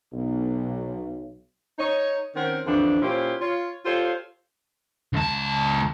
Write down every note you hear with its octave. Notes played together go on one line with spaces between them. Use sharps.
B1
D#4 C#5
D#3 C4 C#4 A#4 F#5
F2 D3 E3 C4 D4
A#2 C#4 E4 F4 G4 C5
F4 C#5
F4 G4 A4 C5 C#5 F5
C#2 A5